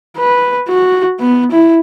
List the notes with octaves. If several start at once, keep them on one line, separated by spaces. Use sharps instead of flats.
B4
F#4
B3
E4